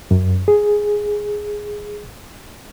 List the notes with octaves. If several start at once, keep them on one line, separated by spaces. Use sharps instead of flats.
F#2
G#4